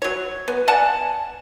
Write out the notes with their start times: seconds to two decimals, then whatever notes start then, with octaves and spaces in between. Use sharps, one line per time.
0.02 F#3 C#5
0.48 B3
0.68 D5 F#5 G#5 A5